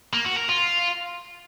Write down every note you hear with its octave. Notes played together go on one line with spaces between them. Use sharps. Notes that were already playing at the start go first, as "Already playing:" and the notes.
A#3
F#4
A#4
F4